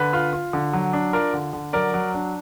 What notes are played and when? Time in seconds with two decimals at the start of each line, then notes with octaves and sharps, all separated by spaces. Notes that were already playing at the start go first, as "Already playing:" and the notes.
Already playing: D3 B4
0.13 F4
0.33 F4
0.53 D3
0.73 F#3
0.93 D4
1.13 F4 A#4 D5
1.34 D3
1.53 D3
1.73 F#3 A#4 D5
1.94 F#3
2.14 D4